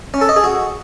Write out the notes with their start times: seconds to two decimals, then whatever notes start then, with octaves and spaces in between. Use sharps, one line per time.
0.14 C#4
0.21 A4
0.29 D#5
0.36 G#4
0.44 F#4